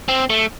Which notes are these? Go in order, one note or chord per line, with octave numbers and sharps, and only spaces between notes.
C4
A3